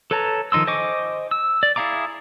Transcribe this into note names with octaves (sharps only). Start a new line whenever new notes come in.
A4 B4 C#5 A5 A#5
D#3 F3 D#4 C6 E6
C5 D#5 G#5 C#6 D6
E6
D5
E4 G#4 F5 A#5 D6